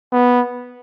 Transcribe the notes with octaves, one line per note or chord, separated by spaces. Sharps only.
B3